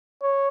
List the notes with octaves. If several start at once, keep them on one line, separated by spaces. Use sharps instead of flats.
C#5